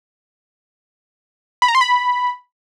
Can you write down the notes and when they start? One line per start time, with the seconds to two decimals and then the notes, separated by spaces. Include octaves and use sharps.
1.62 B5
1.68 A#5
1.75 C6
1.81 B5